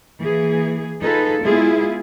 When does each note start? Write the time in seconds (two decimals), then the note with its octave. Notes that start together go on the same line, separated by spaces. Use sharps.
0.19 E3 A#3 G#4
1.02 D#4 F4 G#4 A4 B4
1.41 G#3 B3 E4 F4 G#4